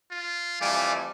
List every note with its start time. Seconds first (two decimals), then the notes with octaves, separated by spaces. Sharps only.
0.11 F4
0.61 F2 E3 G3 A3 F5 G#5 D6